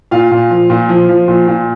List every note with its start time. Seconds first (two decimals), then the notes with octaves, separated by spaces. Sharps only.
0.11 A#2 F4 F5
0.31 A#2
0.50 F3
0.70 A#2
0.89 F3
1.09 F3
1.28 A#2
1.48 A#2